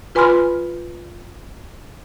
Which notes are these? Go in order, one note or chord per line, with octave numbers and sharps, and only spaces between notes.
F4 B4 G#5 B5 C6 F6